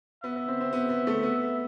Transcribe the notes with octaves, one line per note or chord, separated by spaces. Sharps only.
B3 E5
B3
C4
C4
B3
B3
A3
B3